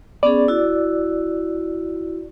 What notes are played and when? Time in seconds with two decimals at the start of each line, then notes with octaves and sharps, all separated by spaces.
0.23 B3 C#4 G#4 D5
0.48 E4 F#4